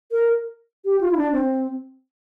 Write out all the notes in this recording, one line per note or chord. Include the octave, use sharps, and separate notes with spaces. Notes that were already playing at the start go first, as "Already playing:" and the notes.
A#4
G4
F4
E4
D4
C4